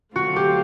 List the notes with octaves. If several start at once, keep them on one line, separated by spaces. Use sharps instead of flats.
D3 F#3 A3 C4 F4 F#4
G4